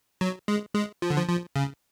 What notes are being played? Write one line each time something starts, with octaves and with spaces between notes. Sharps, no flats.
F#3
G#3
G#3
F3
D3
F3
F3
C#3